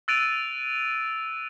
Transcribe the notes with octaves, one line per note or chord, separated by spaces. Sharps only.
E6 F#6 A6 D7 D#7 F7